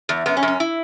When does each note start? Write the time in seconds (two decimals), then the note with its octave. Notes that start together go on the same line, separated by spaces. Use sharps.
0.09 E2
0.26 F#2 B3
0.37 C#4
0.43 F#2
0.48 C#4
0.60 E4